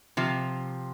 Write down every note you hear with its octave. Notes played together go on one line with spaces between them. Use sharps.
C3 F3